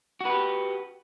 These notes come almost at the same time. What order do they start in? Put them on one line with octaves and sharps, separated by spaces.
F#4 B4 G4